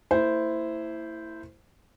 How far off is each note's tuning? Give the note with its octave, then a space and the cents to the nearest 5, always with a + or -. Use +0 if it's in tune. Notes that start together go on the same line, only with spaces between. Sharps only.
A#3 -45 E4 +0 C5 -10